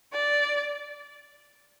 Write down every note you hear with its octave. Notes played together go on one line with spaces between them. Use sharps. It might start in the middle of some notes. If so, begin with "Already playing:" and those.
D5